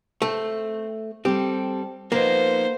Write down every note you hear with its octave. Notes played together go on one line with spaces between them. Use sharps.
A3 C4
G3 C4 G4 A4
F3 A#3 B3 D#4 C5